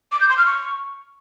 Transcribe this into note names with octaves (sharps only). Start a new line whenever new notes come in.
D6
G6
C6
F6
C#6